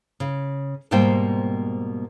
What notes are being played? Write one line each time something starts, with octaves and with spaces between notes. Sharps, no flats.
C#3
G#2 B2 G3 A#3 C5 G5